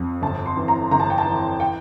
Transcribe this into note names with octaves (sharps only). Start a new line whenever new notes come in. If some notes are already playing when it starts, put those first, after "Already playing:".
Already playing: F2
G1 A5
C6
E3
A#5
G1 A#5
A5
G5
A5
E3
G5